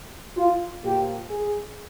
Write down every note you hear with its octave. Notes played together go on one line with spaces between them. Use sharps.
F4
A#2 F3 A#3 G4
G#4